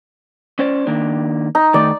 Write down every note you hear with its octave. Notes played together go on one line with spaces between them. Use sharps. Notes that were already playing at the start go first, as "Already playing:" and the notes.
C#4 C5 D5
D#3 A#3 D4
D#4
D#3 A3 D5